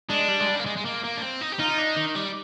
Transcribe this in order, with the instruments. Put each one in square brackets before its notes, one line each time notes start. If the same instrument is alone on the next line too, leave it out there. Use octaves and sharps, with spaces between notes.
[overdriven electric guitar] G#3 [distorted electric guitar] D4
[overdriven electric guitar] G3
G#3
G3
A#3
G#3
G#3
A#3
A#3
D4
C4
D#4
G4
[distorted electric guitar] D#4 [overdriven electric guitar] F4
[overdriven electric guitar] D4
D#3
G3